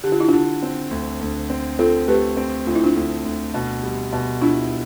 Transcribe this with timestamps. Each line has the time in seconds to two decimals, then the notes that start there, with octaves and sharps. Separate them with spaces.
0.04 D3 G4
0.12 F4
0.20 E4
0.28 D3 D4 F4
0.63 C4
0.91 D2
1.21 D2
1.50 C4
1.79 C4 F4 A4
2.08 A3 G4 B4
2.37 C4
2.66 D2 F4
2.75 E4
2.84 D4 F4
2.96 D2
3.25 D2
3.54 B2
3.83 G3
4.13 B2
4.41 D4 E4 F4